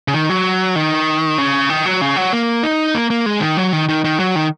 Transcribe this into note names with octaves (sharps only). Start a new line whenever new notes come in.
C#3
D#3
F#3
D#3
C#3
D#3
F#3
C#3
F#3
A#3
D#4
A#3
A#3
G#3
D#3
F#3
D#3
D#3
D#3
F#3
D#3